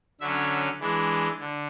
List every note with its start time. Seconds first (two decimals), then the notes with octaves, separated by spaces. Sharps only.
0.20 D3 F#3 C#4 E5
0.80 E3 G#3 D4
1.39 D3